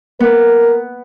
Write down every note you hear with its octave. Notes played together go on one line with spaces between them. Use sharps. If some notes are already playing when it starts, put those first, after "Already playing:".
B3 A#4